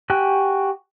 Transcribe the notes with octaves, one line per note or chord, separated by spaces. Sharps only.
F#4 G4 G5 G#5 F#6